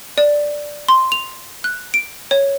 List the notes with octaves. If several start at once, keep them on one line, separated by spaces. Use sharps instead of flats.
D5
C6
F7
F#6
D7
C#5